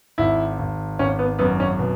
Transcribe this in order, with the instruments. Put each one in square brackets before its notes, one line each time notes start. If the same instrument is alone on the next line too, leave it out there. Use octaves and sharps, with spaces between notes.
[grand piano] G#1 E4
G#1
G#1 C#4
B3
F#2 B3
C#4
B2